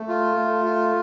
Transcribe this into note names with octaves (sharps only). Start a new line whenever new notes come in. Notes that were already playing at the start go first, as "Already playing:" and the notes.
Already playing: A3
F4
A3
F4